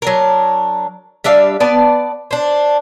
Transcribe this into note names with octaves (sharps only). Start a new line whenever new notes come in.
F#3 D4 A#4
G3 D4 E5 F5
B3 D5 A5
D4 C5